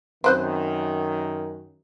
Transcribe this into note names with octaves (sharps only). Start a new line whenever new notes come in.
F#2 D#3 C4 B4 C5